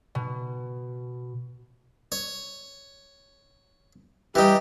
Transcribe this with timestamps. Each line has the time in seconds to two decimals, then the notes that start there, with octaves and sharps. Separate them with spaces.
0.15 B2
2.12 C#5
4.35 E3 G3 D#4 G4